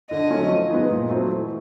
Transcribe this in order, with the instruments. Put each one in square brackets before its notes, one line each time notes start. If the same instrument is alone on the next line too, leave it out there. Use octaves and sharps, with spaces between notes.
[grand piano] D3 [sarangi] D#5
[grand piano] F#3 A3 C#4
F3
G#3 B3 D#4
A#2
F#3 A3 C4
E3